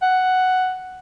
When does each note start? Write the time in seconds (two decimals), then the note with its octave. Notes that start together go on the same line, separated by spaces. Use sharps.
0.02 F#5